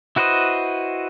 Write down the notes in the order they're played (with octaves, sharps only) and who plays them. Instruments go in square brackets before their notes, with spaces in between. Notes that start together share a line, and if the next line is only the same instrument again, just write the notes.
[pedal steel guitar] E4 F#4 B4 C5 D#5